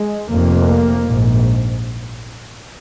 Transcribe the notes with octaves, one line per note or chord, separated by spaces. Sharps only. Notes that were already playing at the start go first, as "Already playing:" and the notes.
Already playing: G#3
F1 F2 C3 A#3
A#1 G#2